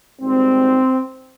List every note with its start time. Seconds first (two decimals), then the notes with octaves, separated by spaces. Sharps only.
0.21 G#1 G#2 G3 C4